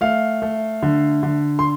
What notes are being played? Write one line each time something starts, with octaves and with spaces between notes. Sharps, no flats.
A3 F5
A3
D3
D3
C6